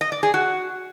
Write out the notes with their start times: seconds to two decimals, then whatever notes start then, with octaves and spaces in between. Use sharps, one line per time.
0.01 D#5
0.12 D5
0.23 G#4
0.34 F#4